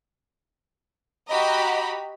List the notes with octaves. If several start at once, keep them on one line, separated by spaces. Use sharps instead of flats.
F#4 G4 D#5 A#5 B5